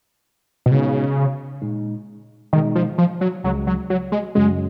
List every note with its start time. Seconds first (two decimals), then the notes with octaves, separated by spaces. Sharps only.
0.66 B2
0.71 A#2 C#3 G#3 B3 D#4 F#4
1.62 A#2 G#3 D#4
2.53 B2 D#3 G#3 D#4
2.75 F3
2.98 F3
3.21 F#3
3.44 C#2 C#3 F#3 G#3
3.67 F#3
3.90 F#3
4.12 G#3
4.35 F#2 C#3 F#3 G#3 C#4 F#4